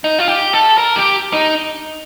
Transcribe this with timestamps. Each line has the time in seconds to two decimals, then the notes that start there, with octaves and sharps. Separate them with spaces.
0.04 D#4
0.19 F4
0.28 G4
0.53 A4
0.78 A#4
0.96 G4
1.33 D#4